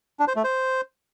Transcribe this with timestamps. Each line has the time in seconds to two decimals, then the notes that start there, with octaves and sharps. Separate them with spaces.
0.20 D4
0.28 C5
0.36 A3
0.44 C5